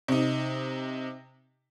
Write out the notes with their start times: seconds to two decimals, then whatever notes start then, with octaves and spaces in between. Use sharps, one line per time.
0.08 C3 D#4